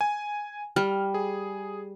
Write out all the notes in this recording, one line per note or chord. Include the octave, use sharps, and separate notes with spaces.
G#5
G3 F6
G#4